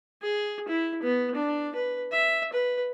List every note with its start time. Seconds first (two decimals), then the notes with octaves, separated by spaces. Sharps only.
0.22 G#4
0.68 E4
1.03 B3
1.35 D4
1.75 B4
2.12 E5
2.53 B4